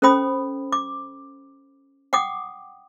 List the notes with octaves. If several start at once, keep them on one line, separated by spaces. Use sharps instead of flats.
C#4 A4 C5 G5 B5 D#6
D6
F#5 G5 D6 D#6